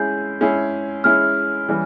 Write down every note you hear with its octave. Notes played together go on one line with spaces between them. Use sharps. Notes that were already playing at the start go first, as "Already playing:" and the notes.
Already playing: G#3 C#4 E4 G#4 G6
G#3 C#4 E4 G#4
G#3 C#4 E4 G#4 F6
E3 G3 C#4